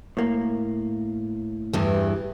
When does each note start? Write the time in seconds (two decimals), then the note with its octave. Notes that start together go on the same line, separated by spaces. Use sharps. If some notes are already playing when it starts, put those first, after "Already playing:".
0.17 A2 A#3
1.73 E2 G2 E3